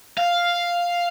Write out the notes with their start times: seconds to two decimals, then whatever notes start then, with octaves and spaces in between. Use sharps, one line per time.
0.18 F5